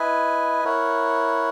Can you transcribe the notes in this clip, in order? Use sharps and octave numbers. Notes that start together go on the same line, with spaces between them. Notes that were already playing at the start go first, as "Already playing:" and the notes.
Already playing: E4 B4 D#5 G#5
E4 A#4 C#5 F#5